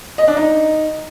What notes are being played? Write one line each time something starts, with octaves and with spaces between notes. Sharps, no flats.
D#5
D4
D#4